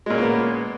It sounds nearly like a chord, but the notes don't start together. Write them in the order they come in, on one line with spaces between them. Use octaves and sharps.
G#3 A#2 C#4 A#3 B3